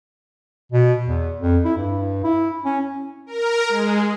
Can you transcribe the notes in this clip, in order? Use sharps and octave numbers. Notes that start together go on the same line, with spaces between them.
B2
E2
F2
E4
G2
E4
C#4
A#4
G#3